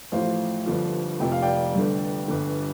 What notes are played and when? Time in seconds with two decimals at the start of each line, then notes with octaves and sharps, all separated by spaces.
0.12 A1 A2 F3 C5 F5
0.66 G1 G2 D3 F3
1.20 F1 F2 C3 F3 G5
1.32 F5
1.42 D5 G5
1.74 G1 G2 D3
2.28 G1 G2 D3